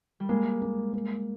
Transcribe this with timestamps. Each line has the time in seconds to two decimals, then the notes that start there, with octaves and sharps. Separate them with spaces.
0.20 G3
0.29 G#3 A#3
0.62 A#3
0.93 A#3